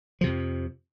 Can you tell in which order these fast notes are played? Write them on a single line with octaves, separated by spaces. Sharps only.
F3 C3 F2